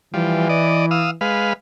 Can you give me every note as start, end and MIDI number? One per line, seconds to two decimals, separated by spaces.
0.14 1.15 52
0.14 0.48 53
0.14 0.48 55
0.49 0.86 74
0.49 0.86 75
0.91 1.11 77
0.91 1.11 87
0.91 1.11 88
1.21 1.53 56
1.21 1.53 71
1.21 1.53 77